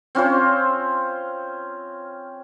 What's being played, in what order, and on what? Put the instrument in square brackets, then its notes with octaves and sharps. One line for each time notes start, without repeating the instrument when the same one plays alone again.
[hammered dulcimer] C4 C#4 F4 C5